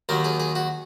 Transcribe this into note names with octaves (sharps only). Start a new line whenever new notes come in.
D#2 D#3 F#3 A#4
G#4
G#4
F#4